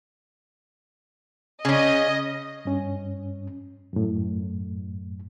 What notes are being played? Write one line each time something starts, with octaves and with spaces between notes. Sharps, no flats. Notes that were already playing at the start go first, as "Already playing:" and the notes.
C#3 C#4 D#5
G2 C#4
F#2 A2